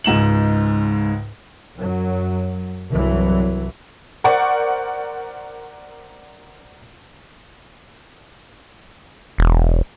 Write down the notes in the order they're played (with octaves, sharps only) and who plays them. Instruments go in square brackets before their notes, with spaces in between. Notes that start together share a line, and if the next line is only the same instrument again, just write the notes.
[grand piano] C#2 G#2 E7 F#7
[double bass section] F#2 F#3
C2 G2 E3 F#3
[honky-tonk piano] A#4 C5 D5 F#5 C#6
[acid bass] E1